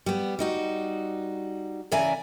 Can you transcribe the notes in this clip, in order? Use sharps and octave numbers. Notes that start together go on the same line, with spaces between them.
G3 B3
G3 D#4 F#4
C#3 E3 D5 E5 G#5 A#5